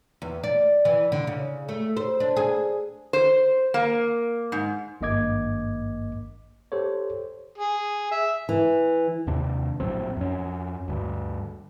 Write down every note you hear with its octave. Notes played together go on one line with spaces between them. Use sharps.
E2
D5
E3
D3
C#3
A3
C5
D4
G#4
C5
A#3
G#2
G#1 G2 A#3 D#5 D6 G#6
G4 A4 C5 C#5
G#4
E5
E3
D#2 C3 D4
A#1 A2 F#3 C4
F2 C#4
D2 G2